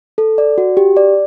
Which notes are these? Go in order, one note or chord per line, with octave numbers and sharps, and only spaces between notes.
A4
D5
F#4
G4
D5